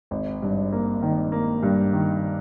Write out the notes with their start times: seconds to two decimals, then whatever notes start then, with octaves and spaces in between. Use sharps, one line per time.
0.11 G#1
0.42 G2
0.72 A#3
1.02 D#3
1.32 A#3
1.63 G2
1.93 D#3